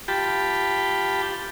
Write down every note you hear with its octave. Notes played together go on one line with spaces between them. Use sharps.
F4 G4 G5 A5 B5